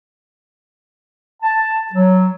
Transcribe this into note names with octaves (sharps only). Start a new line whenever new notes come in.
A5
F#3